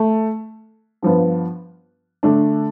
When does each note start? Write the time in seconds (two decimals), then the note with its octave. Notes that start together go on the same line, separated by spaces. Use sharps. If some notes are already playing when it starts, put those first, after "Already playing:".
Already playing: A3
1.02 G2 F3 B3
2.23 D3 A3 D4